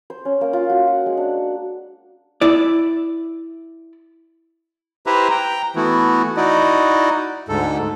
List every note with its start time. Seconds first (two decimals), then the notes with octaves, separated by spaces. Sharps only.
0.10 C5
0.25 C#4
0.41 A#3
0.53 F4
0.69 F#4
0.87 F#5
1.06 G#3
1.17 D4
2.41 E4 D5
5.06 E4 G4 B4 C5 E5 A#5
5.31 G5 A#5
5.76 E3 A3 B3 E4 F#4
6.37 D#4 E4 F#4 D5 D#5
7.49 D2 G#2 A4